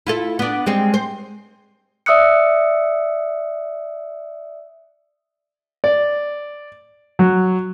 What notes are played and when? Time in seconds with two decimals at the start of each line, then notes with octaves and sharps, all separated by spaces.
0.07 E4 F4 A4
0.39 B3 D4
0.66 G3 G#3 C4
0.94 C5
2.06 D5 E5 D#6 E6 F#6 C#7
5.84 D5
7.19 F#3